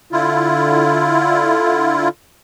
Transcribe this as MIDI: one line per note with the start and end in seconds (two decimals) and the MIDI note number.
0.12 2.08 50
0.12 2.08 64
0.12 2.08 65